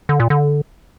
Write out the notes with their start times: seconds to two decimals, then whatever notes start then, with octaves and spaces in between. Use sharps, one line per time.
0.09 D3
0.20 A#2
0.30 D3